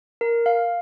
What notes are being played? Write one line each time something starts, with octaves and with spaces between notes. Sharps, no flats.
A#4
F5